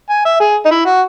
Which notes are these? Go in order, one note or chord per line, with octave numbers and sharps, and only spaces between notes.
G#5
E5
G#4
D#4
E4
F#4